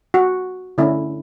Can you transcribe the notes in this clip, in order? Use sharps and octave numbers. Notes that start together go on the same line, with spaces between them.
F#4
D3 A3 C#4 E4